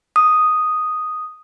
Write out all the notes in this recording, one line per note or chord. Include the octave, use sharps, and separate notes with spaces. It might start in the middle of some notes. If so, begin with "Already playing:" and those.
D#6